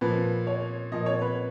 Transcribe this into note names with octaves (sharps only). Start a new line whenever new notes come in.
A#2 F3 B4
C#5
A#2 F3 D#5
C#5
B4